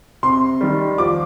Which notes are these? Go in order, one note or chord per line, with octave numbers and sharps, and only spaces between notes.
C3 C6
D#3 G3
F3 D6